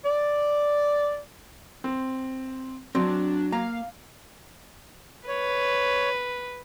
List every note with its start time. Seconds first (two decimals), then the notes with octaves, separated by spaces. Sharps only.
0.06 D5
1.84 C4
2.95 F#3 C4 D4
3.52 A#3 F5 A#5
5.28 B4 C#5